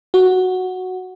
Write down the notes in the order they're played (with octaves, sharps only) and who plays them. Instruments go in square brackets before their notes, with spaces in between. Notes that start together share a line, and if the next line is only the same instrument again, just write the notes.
[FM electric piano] F#4